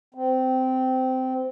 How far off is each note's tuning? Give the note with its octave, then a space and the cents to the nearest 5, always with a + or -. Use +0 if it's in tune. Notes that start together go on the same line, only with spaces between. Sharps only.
C4 -15